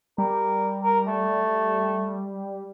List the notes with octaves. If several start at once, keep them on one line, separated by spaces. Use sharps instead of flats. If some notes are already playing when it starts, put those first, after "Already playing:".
G3 A#4
A#4
A3